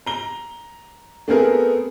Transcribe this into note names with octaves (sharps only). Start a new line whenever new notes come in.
A#5 G7
A3 B3 C4 G#4 A#4